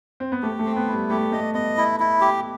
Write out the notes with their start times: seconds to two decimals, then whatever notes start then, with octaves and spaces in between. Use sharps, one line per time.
0.20 C4
0.32 B3
0.42 A3 G4
0.59 A3
0.65 C4
0.76 B3
0.87 E4
0.93 G3
1.10 A3 G4
1.32 A3 D#5
1.54 B3 D#5
1.77 E4
2.00 E4
2.21 G4